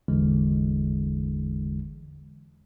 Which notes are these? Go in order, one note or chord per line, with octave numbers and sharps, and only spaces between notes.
G#1 E2 D3 E3 G#3